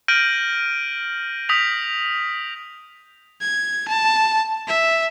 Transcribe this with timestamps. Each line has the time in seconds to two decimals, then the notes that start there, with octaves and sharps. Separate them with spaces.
0.08 F6 G6 A#6 D7 D#7 F#7
1.49 D#6 G6 A#6 B6 F7
3.41 G#6
3.88 A5
4.68 E5